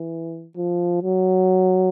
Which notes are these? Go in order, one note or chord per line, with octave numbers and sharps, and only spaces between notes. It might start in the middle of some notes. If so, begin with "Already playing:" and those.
Already playing: E3
F3
F#3